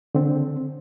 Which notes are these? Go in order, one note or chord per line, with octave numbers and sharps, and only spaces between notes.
D3 C4